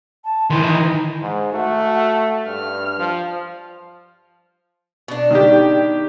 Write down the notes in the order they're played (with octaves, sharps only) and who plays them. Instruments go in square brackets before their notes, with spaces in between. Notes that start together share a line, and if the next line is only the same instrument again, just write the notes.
[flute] A5
[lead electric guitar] D#3 E3 [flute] C6
[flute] D#4
[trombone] G#2
[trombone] A3 [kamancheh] F#4
[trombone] G2 [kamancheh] F6
[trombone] F3
[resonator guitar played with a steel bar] B2 D4
[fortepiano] D#3 G4